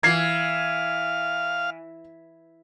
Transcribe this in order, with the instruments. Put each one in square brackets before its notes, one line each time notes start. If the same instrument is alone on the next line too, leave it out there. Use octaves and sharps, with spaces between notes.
[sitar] E3 [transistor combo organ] F5 [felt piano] G#6 C7